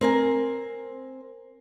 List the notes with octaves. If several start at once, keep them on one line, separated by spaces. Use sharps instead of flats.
C4 A#4 G#5